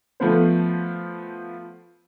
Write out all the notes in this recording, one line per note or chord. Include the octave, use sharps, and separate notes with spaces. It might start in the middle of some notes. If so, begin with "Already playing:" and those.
F3 A3 B3 C5